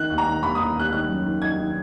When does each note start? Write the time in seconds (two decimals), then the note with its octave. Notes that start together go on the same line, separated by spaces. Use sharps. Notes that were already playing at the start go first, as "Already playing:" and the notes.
Already playing: D#3 F#6
0.10 D#2
0.18 A#5
0.26 D#3
0.43 D#2 B5
0.55 D#6
0.59 D#2
0.76 D#2 F#6
0.92 D#3 F#6
1.09 F#2
1.26 D#3
1.42 D#3 G#6
1.58 D#3